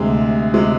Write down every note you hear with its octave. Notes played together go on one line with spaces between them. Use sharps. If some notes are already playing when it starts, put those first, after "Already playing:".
Already playing: D2 C3 G#3
C3 G#3